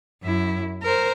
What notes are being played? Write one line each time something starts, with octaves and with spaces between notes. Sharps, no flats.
F#2 E4
A#4 C5